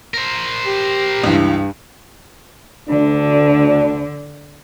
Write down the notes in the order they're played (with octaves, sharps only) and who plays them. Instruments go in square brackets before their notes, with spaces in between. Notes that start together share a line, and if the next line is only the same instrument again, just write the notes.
[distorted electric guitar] A#4 C5
[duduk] G4
[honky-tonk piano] C#2 E3 [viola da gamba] G2
[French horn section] D2 D4 [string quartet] D3